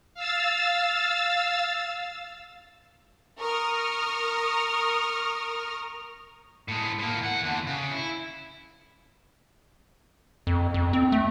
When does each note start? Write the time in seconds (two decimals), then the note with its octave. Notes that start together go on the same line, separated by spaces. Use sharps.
0.14 F5 E6 A6
3.39 A#4 C#6 D#6 F6
6.68 A2 G#3
6.99 A2 A#3
7.21 E2 F#5
7.43 E2 D3
7.67 C#3
7.91 E4
10.47 F2
10.74 F2
10.93 C4
11.12 A3